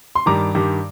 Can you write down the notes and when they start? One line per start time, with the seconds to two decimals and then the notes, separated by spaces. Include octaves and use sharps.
0.15 C6
0.26 G2 D#3 G3 A#5 D6
0.55 G2 D#3 G3